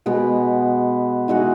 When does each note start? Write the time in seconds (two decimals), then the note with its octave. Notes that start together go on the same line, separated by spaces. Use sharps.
0.06 B2 G#3 B3
1.28 E3 G#3 D#4 F#4